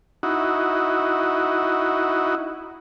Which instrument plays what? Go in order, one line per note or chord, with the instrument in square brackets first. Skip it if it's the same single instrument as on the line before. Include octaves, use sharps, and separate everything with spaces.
[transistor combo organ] D#4 E4 F#4